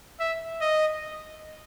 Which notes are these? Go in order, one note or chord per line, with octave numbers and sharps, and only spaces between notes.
E5
D#5